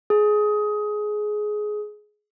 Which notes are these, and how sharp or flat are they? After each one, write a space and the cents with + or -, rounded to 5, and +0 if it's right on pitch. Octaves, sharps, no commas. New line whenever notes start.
G#4 +15